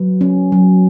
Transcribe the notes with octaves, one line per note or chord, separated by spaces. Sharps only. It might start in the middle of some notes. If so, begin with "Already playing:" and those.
Already playing: F#3 B4
C#4
F#3